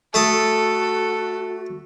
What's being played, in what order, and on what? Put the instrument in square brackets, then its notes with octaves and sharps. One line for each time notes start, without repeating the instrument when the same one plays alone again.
[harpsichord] A3 A5 D#6 [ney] F#4 [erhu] A4